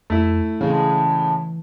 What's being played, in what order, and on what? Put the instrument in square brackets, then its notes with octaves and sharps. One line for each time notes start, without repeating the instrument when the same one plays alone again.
[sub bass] F2 [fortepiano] A3 E4
[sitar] A2 G#3 [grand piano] C#3 [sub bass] E3